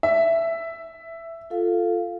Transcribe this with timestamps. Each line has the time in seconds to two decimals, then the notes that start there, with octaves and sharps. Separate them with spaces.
0.03 E5
1.50 F4 A4 F5